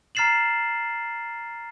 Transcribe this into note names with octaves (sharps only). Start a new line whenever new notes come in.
A#5 F6 A6 C7 E7 F#7